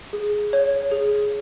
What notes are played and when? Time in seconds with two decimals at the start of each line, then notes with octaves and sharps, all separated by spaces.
0.13 G#4
0.53 C#5
0.91 G#4